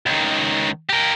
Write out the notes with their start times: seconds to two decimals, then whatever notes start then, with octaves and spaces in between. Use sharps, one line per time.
0.06 C#2 D#3
0.89 G4 A#4